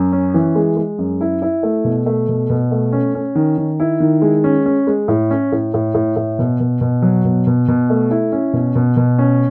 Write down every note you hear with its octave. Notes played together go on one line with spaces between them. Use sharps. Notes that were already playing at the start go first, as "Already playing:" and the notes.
Already playing: F#2
C#4
E3
G#3
G#3
F#2
E4
E4
A3
B2
A3
B2
B2
A3
C#4
C#4
D#3
D#3
E4
D#3
G#3
C#4
C#4
G#3
A2
C#4
A2
A2
A2
A2
B2
B2
B2
F#3
B2
B2
B2
A3
E4
C#4
B2
B2
B2
C#4